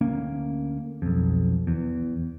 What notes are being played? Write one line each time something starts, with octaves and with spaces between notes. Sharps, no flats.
D2 A#3 C#4
B1 F2
E2